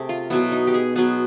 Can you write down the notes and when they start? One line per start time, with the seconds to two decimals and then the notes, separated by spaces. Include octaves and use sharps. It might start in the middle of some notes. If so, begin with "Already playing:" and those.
Already playing: C3 A3 G#4
0.09 F4
0.30 B2 F#3 B3 E4
0.52 D#4
0.67 G4
0.74 G#4
0.96 B2 F#3 B3 G#4